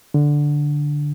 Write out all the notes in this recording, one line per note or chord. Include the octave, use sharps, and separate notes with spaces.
D3